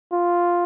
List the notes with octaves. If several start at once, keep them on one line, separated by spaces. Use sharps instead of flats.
F4